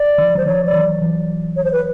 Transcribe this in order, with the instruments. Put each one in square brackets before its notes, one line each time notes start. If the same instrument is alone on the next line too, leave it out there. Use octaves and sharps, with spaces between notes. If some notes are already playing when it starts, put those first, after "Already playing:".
Already playing: [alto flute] D5
[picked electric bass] D#3 F3
[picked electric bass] F#3 [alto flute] C5
[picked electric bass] D#3 F3 [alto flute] C#5
[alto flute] D5
[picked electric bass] E3 F#3
E3 F#3
[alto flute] C#5
C5
B4